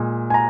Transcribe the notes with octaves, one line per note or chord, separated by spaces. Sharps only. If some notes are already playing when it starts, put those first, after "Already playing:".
Already playing: A#2 G#3
G#5
A#5